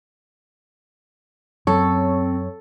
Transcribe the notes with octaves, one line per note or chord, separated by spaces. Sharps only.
F#2 F#3 C4 A4 C#5